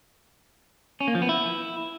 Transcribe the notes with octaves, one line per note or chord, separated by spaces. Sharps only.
C#4
A#3
F3
B3
E4